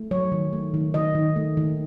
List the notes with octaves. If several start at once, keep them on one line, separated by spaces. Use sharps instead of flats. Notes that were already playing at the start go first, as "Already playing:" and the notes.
Already playing: A3
F#3 C#5
D#3
A3
D#3
D#3 D#5
D#3
A3
D#3